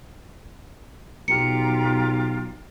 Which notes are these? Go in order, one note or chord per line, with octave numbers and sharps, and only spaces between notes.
B1 F4 G4 A#5 C#7